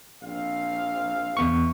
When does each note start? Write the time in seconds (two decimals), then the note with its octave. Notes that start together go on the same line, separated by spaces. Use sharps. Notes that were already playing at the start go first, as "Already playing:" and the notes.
0.23 A#1 C4 F5
1.37 E2 B3 C#6